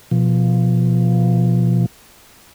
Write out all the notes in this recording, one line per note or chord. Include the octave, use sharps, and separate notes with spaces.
B2 F3